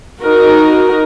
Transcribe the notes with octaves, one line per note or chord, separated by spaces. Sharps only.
D#4 F#4 A#4